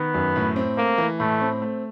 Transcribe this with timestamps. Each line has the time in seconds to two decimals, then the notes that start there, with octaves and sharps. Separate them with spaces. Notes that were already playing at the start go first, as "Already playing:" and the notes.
Already playing: D#3 B3
0.14 F#2
0.36 A2
0.56 C4
0.77 A3 A#3
0.98 E3
1.20 A2 A3
1.41 C4
1.62 A3